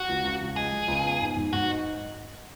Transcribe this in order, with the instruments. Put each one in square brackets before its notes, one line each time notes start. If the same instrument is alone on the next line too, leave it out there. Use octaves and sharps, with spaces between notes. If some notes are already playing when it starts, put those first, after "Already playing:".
Already playing: [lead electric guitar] F#4
[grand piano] C#2
C#2
C#2
[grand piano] G#3 [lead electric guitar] G#4
[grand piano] G#3
C#2
B3
G#2
G#2
[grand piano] G#2 [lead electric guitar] F#4
[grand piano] D#4